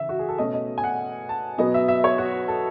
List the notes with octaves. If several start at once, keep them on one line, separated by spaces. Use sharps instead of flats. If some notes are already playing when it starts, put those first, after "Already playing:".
Already playing: C#3 E3 E5
F#4
G#4
A4
B2 A3 C#4 D#5
D#5
G#5
F#5
A5
B2 F#3 B3 D#5
E5
E5
C#5
F#4
A4